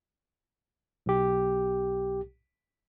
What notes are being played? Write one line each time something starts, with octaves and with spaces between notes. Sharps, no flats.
B1 G4